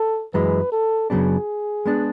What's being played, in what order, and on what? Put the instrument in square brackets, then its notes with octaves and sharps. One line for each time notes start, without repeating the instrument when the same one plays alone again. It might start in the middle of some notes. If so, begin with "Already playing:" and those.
Already playing: [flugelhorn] A4
[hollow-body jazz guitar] F#2 E3 G#3 [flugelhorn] B4
[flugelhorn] A4
[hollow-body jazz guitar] F#2 C#3 F#3 B3 D4 [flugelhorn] G#4
[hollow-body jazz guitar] G#3 B3 D4